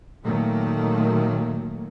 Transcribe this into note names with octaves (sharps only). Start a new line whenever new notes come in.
A#2 D#3 F#3 A3 A#3